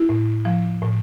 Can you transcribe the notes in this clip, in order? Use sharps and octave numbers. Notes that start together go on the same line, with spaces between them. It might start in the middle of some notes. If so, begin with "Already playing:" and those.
Already playing: E4
A2
F3
A2